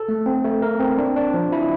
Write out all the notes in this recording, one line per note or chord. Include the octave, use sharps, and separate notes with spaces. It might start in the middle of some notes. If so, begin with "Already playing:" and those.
Already playing: A4
A3
C4
A3
A#4
C4
D4
D4
F3
E4